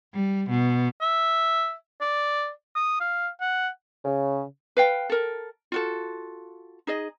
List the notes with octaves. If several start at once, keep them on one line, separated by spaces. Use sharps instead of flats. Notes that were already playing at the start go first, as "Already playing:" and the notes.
G3
B2
E5
D5
D#6
F5
F#5
C#3
B4 F5 G5
A4 A#4
F4 F#4 A4
D#4 G#4 D#5